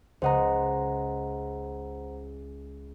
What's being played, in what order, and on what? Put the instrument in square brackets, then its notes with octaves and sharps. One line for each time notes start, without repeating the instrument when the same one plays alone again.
[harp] C#2 D#5 [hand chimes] C5 F#5 A#5